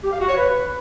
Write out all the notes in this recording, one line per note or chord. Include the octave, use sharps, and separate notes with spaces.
G4
F5
F#4
C#5
B4